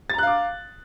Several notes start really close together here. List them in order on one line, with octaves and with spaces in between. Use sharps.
A6 A#5 F#6 F5 D6